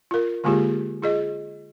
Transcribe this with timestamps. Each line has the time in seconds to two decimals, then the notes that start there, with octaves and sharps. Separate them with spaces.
0.11 F4 A#4
0.44 D3 G#3 A#3 F4 G4 G#4
1.02 F4 G#4 D#5